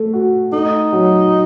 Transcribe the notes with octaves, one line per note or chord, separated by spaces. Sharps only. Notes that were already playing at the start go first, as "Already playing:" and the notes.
Already playing: A3
F#4
A3 D#4
F#3